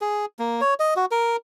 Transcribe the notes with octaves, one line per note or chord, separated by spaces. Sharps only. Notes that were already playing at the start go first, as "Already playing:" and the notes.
G#4
A#3
C#5
D#5
F#4
A#4